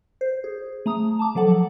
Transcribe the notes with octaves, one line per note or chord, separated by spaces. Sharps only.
C5
G#4
A3 A#5 D#6
A5 D6
F3 F#3 A4 F#5 A5